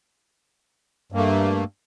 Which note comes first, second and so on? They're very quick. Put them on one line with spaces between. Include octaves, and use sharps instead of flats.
G2 A#3 A3